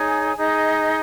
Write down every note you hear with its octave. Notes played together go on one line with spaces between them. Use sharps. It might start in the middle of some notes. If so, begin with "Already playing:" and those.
Already playing: D#4 G#4 C#5 G#5
D#4 G#4 D#5